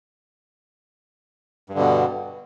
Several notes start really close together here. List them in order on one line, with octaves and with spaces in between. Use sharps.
G2 D3 B2